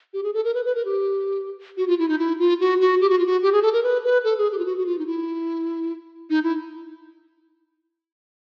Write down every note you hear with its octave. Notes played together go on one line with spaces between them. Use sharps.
G4
G#4
A4
A#4
B4
B4
A#4
G4
F#4
F4
E4
D#4
E4
F4
F#4
F#4
G4
F#4
F4
F#4
G4
G#4
A4
A#4
B4
B4
A4
G#4
G4
F4
F#4
F#4
F4
D#4
E4
D#4
E4